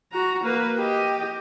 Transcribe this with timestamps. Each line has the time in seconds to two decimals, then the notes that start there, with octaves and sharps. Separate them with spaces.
0.12 F#4 A#5
0.44 A#3 B4
0.79 G4 D#5